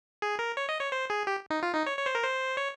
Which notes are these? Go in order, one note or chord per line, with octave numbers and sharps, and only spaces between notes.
G#4
A#4
C#5
D#5
C#5
C5
G#4
G4
D#4
F4
D#4
C#5
C#5
C5
A#4
C5
C#5